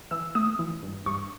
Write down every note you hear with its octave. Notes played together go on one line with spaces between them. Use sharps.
E3 E6
A3 D#6
E3
G2
G2 C#6